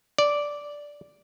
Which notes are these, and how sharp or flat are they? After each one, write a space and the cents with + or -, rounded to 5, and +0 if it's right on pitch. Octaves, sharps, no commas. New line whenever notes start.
D5 -5